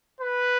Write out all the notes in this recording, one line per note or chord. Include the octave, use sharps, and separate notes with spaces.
B4